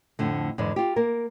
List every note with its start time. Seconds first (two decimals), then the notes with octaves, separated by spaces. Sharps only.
0.19 F2 A2 D3 A3
0.58 E2 G#2 D3
0.76 F4 G4
0.96 A#3 A#4